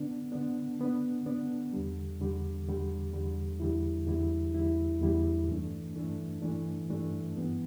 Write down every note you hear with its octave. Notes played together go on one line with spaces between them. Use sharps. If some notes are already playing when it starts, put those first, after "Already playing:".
Already playing: D3 B3 D4
D3 B3 D4
D3 B3 D4
D3 B3 D4
E2 D3 G3
E2 D3 G3
E2 D3 G3
E2 D3 G3
E2 D3 G3 E4
E2 D3 G3 E4
E2 D3 G3 E4
E2 D3 G3 E4
G2 E3 A3 D4
G2 E3 A3 D4
G2 E3 A3 D4
G2 E3 A3 D4
G2 E3 B3